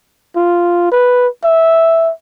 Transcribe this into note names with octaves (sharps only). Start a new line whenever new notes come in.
F4
B4
E5